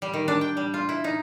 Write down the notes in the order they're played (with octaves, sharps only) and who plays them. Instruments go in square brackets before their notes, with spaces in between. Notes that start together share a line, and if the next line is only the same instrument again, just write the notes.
[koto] G3
D#3
D4
G5
G3
F4
E4
D#4